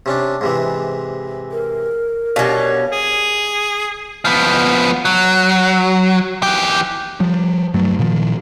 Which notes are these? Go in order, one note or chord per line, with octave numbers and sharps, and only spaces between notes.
C3 C#4 D4
G#2 C3 E3
A#4
B2 C#4 F#4 G4 D5 F5 C#6
G#4
F3 B3
F#3
E3 G4
F3 G3
G2 F#3 A3
A#2 D#3 F3